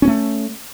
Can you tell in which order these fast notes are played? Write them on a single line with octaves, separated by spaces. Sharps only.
C#4 B3 A3